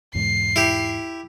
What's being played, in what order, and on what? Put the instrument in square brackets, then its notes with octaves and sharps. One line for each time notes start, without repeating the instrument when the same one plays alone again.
[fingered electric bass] E2 G#2 B2 [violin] C7
[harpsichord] E4 G4